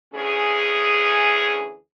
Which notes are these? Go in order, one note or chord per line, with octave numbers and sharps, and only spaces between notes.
D2 E3 C#4 G#4